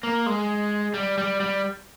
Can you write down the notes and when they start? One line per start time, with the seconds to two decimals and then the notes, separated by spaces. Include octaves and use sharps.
0.03 A#3
0.26 G#3
0.94 G3
1.18 G3
1.40 G3